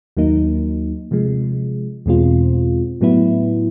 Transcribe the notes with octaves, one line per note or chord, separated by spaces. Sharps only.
D#2 D#3 F#3 A#3 D#4
C3 F3 G#3
E2 B2 G#3 C4 F4
A2 F#3 B3 E4